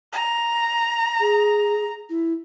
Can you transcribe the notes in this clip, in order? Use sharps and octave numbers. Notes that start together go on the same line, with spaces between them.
A#5
G#4
E4